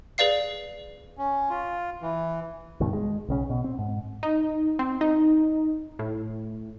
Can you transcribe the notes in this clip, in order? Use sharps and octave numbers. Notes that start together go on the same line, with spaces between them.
G#4 B4 D5 F5 C7
C#4
F4
E3
C#2 G2 B2 D#3
G#3
B1 C#3 C#4
B2
C4
G#2
D#4
C4
D#4
A2